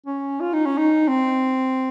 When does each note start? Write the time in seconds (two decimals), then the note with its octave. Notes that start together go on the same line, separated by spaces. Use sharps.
0.06 C#4
0.41 F4
0.53 D#4
0.66 C#4
0.78 D#4
1.08 C4